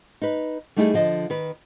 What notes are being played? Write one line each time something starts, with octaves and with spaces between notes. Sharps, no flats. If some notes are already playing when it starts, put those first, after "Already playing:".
D#4 B4
G3 A3 D#4 E4 G4 G#4
D3 F3 D#5
D#3 B4